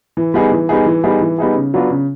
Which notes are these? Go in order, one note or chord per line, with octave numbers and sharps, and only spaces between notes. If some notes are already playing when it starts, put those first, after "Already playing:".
E3
G3 B3 D#4 G#4
E3
G3 B3 D#4 G#4
E3
G3 B3 D#4 G#4
E3
G3 B3 D#4 G#4
C#3
F#3 B3 D4 F4
C#3